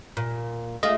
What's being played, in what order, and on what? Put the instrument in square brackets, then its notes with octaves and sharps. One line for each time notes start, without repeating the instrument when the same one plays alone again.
[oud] A#2
[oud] A3 F4 G#4 [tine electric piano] D#5